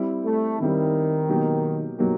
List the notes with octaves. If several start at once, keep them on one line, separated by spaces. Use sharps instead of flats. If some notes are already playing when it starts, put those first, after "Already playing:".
Already playing: G3 C4 E4
A3
D#3 G3 C4 E4
B2 F#3 A#3 D#4 G4
B2 F#3 A#3 D#4 G4